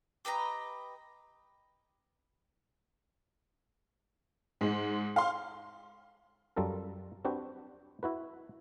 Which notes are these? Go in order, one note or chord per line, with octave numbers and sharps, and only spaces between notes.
G4 B4 D#5 A#5
G#2 G#3
F5 C6
F#2 G3 F4 A4 A#4
C4 D4 F#4 G4 B4
E4 F#4 B4